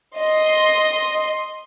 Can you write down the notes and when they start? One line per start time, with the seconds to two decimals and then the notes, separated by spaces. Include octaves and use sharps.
0.17 D#5 C6